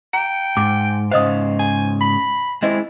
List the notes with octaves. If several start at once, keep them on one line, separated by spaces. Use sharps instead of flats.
G5 A#5
G#2 D6
G#2 C#3 C5 D#5 F5 D#6
G#5
B5
G#3 C4 E4 D#5